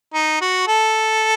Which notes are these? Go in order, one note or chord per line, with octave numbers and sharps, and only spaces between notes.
D#4
F#4
A4